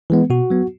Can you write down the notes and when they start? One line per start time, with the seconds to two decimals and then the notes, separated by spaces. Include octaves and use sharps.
0.10 E3 G#3 B3
0.30 B2 F#4
0.50 F#3 B3